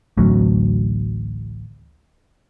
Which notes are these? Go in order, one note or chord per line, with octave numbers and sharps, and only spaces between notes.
A1 D2 F#3